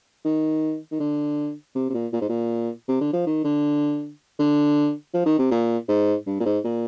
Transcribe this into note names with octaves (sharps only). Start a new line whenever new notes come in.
D#3
D#3
D3
C3
C3
A#2
A#2
G#2
A#2
C3
D3
F3
D#3
D3
D3
F3
D#3
C3
A#2
G#2
G2
A#2
G#2
A#2